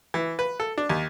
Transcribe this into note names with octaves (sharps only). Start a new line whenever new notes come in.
E3
B4
A4
D4
D#2